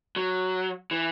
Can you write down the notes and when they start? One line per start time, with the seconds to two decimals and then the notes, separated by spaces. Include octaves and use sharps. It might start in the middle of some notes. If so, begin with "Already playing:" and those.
0.16 F#3
0.91 E3